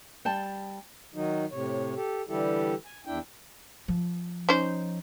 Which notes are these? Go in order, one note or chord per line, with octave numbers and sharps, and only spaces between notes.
G3 G5 A5
D#3 F#3 D#4
A2 C3 C#5
G4 A4
D3 E3 G3 E4 G4 A4
G#5
E2 D4 E4 G5
F3
C#4 D#4 C5